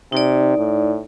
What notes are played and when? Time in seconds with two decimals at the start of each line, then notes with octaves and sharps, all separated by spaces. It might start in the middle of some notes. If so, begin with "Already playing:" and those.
0.12 C3 D#4 D5
0.58 A2